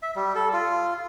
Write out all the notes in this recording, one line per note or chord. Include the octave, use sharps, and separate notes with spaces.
E5
G3
A4
F4